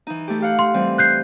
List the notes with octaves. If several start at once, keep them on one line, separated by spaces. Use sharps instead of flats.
E3 D#4
A3 G4
G4 F5 F#5
C6
E3 G3 C4
F#6 G6 C7